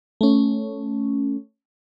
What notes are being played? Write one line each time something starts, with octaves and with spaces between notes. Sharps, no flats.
A3 C#4